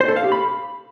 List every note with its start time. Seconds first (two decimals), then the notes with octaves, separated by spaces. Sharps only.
0.01 C5
0.08 A4
0.16 F5
0.24 G4
0.32 B5